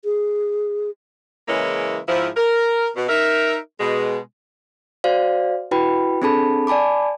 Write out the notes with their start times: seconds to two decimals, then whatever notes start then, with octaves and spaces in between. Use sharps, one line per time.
0.04 G#4
1.48 C#3 E3 G#3 A#3 C#4 E4
2.08 G#2 F3 E4
2.37 A#4
2.96 B2
3.09 D#4 A#4 E5
3.80 B2 G#3
5.04 F#4 C5 D5 F5
5.71 E4 F#4 B4 G5 B5
6.22 C4 D4 G#4 A4 A5 B5
6.67 D5 G#5 A5 B5 D6